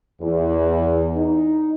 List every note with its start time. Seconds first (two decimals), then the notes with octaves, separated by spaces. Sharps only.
0.21 E2
1.16 D#4